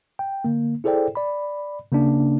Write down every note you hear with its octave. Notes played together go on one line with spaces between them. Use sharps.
G5
D3 A#3
E4 G#4 A4 C5 D5 G5
D5 B5
C#3 A#3 C#4 D4